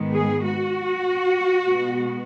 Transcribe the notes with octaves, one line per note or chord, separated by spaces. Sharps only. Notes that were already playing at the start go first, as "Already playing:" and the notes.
Already playing: G#2 D#3 G#3 B3
G#4
F#4
B2 G#3 B3